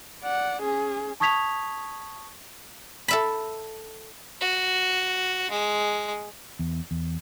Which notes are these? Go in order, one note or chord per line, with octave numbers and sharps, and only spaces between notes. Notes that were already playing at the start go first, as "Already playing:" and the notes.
D5 F#5
C#4 G#4
A5 C#6 D#6 G#6 B6 F7
A4 E5 B5
F#4
G#3
E2
E2